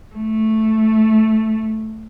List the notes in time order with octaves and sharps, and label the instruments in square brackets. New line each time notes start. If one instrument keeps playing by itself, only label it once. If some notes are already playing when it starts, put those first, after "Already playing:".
[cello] A3